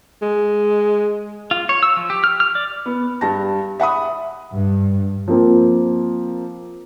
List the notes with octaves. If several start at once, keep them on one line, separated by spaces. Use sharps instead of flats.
G#3
F4
C#5
E6
F3
G4
F6
F6
D5
B3
G2 A5 A#6
E5 F#5 B5 D#6
G2
F3 A#3 C4